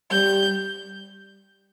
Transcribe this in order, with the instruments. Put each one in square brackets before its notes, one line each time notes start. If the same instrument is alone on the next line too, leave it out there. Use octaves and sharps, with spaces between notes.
[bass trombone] G3 [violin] G6